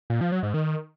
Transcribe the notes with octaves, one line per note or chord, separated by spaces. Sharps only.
A#2
F3
F#3
G#2
D#3